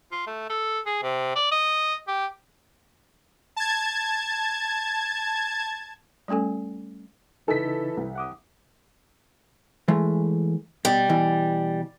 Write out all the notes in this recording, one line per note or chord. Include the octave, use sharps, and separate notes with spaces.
F4
A3
A4
G#4
C3
D5
D#5
G4
A5 G#6
G3 A3 C#4 A4 G#5
C#3 E3 D#4 A4 B6
C2
F#5 D6 D#6
E3 G#3 A3
B2 G3
B2 E3